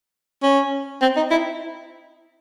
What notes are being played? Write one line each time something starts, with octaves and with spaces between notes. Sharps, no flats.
C#4
C4
D#4
E4